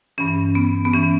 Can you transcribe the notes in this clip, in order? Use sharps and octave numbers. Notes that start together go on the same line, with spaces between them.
G2 E3 C#4
B3
B3
E3 C#4